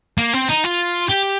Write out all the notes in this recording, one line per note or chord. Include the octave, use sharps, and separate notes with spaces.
A#3
C4
D#4
F4
G4